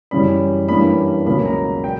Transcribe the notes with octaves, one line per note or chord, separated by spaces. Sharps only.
F#2 C#3 E3 G3 C#4 B5
G2 E3 G3 A#3 C#4 B5
C#2 B2 F#3 A#3 C#4 B5
A#5
G5